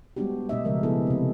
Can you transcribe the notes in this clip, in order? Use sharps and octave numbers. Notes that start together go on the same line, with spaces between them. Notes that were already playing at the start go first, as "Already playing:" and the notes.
G3 G#3 B3 D4 F#4 G4
B2 A3 D4 D#5 E5
C#3 F3 G#3 A#4
B3 E4 G#4 A4
C3 C4